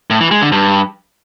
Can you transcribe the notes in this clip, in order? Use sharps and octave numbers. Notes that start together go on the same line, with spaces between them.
A2
E3
G#3
D3
G2